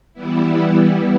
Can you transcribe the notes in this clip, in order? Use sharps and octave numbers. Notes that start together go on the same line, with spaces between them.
E3 G3 B3 E4